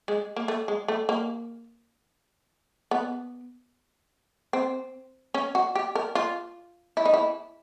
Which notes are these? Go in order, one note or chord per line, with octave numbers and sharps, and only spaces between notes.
G#3
A#3
A3
G#3
A3
A#3
B3
C4
C#4
F#4
G4
A#4
F4
E4
D#4
E4